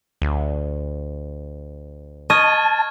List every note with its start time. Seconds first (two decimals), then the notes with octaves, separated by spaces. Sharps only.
0.22 D2
2.30 D#5 A5 C#6 F6 G#6